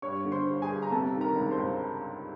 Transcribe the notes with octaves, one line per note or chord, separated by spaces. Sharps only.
G2 C#5 C#6
D3
C5 C6
G1
G#4 G#5
G1
A#5
C3 A4 A5
D#3
A#4 A#5
C#2
C5 C6
C#2